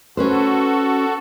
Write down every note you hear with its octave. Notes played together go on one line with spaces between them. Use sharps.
C#4 F#4 A4 B4 C5